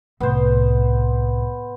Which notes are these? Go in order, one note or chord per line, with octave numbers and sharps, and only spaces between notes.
C2 A2 B3 C5